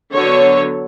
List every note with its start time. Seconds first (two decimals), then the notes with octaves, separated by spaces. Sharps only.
0.14 D3 F#3 B3 A4 C#5